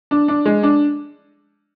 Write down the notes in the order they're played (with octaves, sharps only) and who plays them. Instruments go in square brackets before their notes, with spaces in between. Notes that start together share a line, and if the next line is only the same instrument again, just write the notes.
[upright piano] D4
D4
G#3
D4